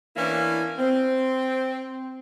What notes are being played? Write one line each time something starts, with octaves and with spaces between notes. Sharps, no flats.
E3 A#3 B3 C#4 D4 E4
C4